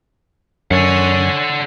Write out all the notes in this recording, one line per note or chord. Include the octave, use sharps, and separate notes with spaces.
F#2 A4 C#5 F#5 G#5